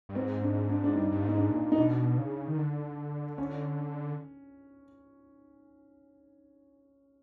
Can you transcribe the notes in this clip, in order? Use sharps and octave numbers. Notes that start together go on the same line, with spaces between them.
G2
G#2 C4
D4
D4
D4
G2 D#4
G2
G#2
D#4
D4
A#2
D#4
B2 D4
C#3
D#3
D3
C#4